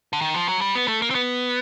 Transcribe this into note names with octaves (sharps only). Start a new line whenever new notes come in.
D3
D#3
F3
F#3
G3
B3
A3
A#3
C4
B3